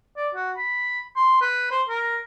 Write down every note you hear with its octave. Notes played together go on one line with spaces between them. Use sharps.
D5
F#4
B5
C6
B4
C5
A#4